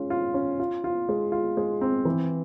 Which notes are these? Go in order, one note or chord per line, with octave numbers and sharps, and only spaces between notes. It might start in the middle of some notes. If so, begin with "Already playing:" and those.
Already playing: G#3 C#4 F4
F4
C#4
F4
F4
G#3
F4
G#3
C4
E3